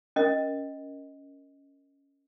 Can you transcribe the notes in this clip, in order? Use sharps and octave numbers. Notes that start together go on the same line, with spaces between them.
C#4 A#4 D#5